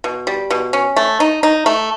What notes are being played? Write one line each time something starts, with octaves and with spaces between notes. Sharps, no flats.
B2
G3
B2
C#4
A3
D#4
D#4
A3